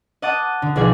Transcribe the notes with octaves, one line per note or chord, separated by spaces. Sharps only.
D#5 F#5 A5 D6 D#6
D3
B1 F3 G#4 D5 G#6